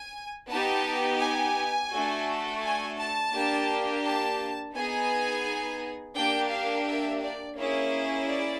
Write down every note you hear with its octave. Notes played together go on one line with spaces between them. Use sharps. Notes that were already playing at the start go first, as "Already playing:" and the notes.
Already playing: G#5
B3 D#4 G4 A5
G#5
A3 D4 F#4 A4
G#5
A5
A#3 D4 G4
A5
B3 D#4 G#4 G#5
A#3 D4 G4 G5
F5
E5
D5
A#3 C#4 E4 G#4 C#5
D5